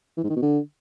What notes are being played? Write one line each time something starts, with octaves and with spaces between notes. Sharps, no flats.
E3
G#2
D#3
B2
D3